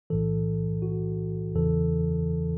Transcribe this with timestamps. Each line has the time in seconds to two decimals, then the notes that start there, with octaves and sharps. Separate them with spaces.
0.10 B1 A2 E3 A4
0.82 F#4
1.55 E2 C#3 E3 A4